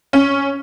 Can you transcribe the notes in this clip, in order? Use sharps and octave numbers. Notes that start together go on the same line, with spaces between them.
C#4